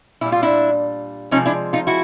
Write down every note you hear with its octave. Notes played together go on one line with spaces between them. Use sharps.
A#2 G3 E4
F4
D4 E4
C3 F3 G#3 C#4 D#4
D4 E4
D#4 F4
E4 F#4